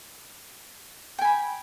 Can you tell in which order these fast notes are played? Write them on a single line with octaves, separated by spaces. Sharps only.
G5 G#5 B5